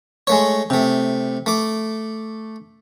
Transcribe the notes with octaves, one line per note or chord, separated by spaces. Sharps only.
G#3 A3 C#5
C3 A3
A3 D6